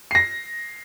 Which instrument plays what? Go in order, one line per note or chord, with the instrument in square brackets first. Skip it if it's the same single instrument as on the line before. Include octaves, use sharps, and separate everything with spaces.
[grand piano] A#6 C7